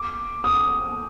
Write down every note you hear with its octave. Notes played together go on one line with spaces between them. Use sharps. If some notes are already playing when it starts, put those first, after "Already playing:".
Already playing: D6
D#6